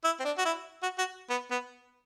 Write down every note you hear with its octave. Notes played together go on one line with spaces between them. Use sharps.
E4
C4
D4
F#4
E4
F#4
F#4
B3
B3